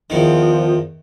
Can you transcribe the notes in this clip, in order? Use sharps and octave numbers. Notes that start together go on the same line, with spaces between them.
E2 D#3 F3